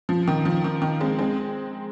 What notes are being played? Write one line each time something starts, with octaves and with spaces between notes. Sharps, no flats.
F3
D#3
F3
D#3
D#3
G#3 C4
G#3 C4